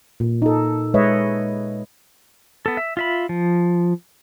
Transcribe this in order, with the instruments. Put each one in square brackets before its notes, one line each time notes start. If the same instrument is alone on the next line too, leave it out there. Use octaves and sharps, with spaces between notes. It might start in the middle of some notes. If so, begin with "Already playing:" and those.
[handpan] A#2
D#4 A4
G#3 B4 C#5 D#5 E5
[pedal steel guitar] B3 A4
E5
F4 E5 B5
F3